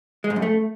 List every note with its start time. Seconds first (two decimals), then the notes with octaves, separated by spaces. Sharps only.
0.24 G#3
0.30 G#2
0.36 F#2
0.42 A3